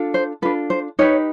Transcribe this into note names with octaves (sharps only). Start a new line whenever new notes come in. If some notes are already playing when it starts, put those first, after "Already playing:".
Already playing: D4 F4 A4
C5
D4 F4 A4 B4
C5
D#4 G4 B4 C#5